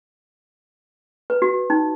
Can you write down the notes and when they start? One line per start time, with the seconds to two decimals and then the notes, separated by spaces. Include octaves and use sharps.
1.30 B4
1.42 F#4
1.70 D#4